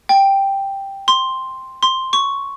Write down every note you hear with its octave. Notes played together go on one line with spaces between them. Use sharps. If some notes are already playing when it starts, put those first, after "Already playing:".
G5
C6
C6
C#6